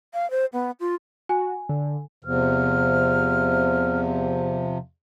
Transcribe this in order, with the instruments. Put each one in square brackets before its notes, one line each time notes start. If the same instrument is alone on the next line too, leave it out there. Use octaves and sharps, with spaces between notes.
[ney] F5
C5
B3
F4
[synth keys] F#4 [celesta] G#5
[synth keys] D3
[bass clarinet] E2 [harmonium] C3 F3 [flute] F6